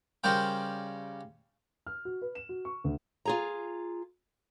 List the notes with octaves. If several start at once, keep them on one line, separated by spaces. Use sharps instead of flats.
C#3 G3 A#4 C5 G5
F6
F#4
B4
E7
F#4
C#6
D2
F4 G#4 A#5